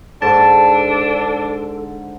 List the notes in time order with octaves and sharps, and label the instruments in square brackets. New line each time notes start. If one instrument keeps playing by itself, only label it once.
[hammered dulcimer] G#2 D3 D6 [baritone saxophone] D4 [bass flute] A4 [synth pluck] A5